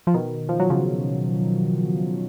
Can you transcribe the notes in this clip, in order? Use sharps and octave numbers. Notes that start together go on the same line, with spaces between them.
F3
B2 D#3
F3
F#3
C#3 F3